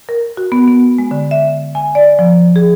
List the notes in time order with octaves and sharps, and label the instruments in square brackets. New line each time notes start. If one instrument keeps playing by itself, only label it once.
[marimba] A#4
F#4
B3
B3
G#3
D3
E5
G#5
D5
F3
G#4